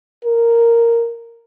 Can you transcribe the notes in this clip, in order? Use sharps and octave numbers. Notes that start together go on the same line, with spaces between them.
A#4